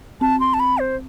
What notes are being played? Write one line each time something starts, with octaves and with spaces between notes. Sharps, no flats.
C4 A5
C6
A5
B5
C5